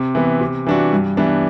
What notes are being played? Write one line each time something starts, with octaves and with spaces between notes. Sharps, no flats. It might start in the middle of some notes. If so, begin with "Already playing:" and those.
Already playing: C3
E3 B3
C3
E3 G3 D4 F#4
G2
E3 G3 B3 D4